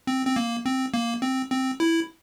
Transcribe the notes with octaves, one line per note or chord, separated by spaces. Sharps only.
C4
C4
A#3
C4
A#3
C4
C4
E4